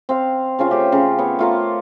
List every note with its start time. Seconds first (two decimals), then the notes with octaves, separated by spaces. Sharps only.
0.09 C4 F5
0.59 C#3 C#4 F4
0.70 A3 G4 C5
0.92 C#3
1.18 B3 C#5
1.39 A3 F4 A#4